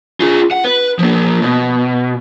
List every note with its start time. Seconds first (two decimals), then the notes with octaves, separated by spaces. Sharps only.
0.20 F4 G#4
0.51 F#5
0.64 B4
0.99 F3 A#3
1.42 B2